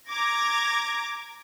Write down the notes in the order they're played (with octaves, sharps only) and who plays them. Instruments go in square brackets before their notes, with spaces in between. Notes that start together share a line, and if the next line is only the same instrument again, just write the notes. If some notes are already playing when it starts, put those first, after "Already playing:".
[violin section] A#5 D6 G#6 A#6